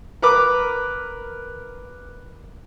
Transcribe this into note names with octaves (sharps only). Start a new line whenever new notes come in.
A#4 B4 D6